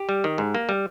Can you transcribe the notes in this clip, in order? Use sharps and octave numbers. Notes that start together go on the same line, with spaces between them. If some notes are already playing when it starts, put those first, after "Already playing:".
Already playing: G4
G3
D#3
G#2
A#3
G3